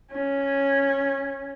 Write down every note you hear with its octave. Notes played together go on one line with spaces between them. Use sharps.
C#4